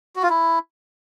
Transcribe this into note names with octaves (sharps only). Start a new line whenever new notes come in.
F#4
F4
E4